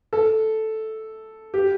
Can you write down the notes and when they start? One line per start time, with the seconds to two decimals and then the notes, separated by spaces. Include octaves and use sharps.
0.13 A4
1.54 G4